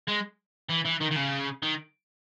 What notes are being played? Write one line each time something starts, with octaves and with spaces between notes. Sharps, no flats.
G#3
E3
E3
D#3
D#3
C#3
D#3